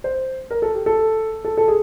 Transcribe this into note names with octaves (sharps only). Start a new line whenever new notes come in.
C5
A#4
A4
G4
A4
A4
A4
G#4